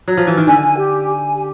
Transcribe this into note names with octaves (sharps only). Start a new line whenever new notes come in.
F#3
F3
E3
D#3
D3 G#5
G4
G#5
G4